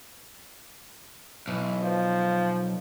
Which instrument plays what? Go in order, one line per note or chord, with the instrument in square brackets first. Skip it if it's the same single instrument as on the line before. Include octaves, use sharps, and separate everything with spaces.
[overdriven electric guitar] B1 [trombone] E3
[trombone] F3